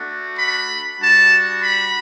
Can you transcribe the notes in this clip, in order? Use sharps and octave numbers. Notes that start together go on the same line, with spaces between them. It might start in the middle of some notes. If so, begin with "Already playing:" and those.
Already playing: A3 D4 F#4
B5
G3 D4 F#4 A5
B5